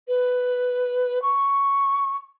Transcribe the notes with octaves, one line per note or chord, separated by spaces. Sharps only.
B4
C#6